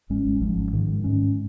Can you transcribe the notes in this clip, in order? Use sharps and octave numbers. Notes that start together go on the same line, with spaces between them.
G#1 G#2 G#3 C#4
G#1 G#2 F3 C#4
G#2 D#3 G#3
G#2 G#3 C#4